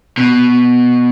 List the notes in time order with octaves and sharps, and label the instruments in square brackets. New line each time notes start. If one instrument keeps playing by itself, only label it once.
[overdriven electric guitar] B2